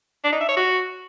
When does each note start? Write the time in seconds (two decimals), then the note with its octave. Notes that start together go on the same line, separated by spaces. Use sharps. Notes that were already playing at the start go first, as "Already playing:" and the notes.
0.24 D4
0.32 D#4
0.41 E5
0.49 C#5
0.57 F#4